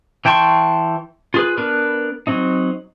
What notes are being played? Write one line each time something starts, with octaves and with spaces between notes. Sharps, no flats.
E3 G5 A5 C6 C#6
F4 G#4 B4
B3 D4 A#4 B4
F#3 C4 D#4